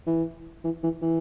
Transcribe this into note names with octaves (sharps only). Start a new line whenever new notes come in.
E3
E3
E3
E3